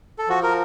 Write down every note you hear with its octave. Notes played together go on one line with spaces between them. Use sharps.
A4
F3 F#4
A#4